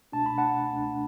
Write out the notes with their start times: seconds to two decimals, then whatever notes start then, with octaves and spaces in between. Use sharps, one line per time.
0.12 C#2 B2 A3 D4 A5
0.26 B5
0.38 F#5 A5
0.71 C#2 B2 A3 D4